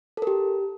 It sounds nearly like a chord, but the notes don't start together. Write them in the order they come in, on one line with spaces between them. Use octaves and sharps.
A4 A#4 G4